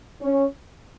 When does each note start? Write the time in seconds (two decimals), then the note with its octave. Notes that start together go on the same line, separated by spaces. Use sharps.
0.22 C#4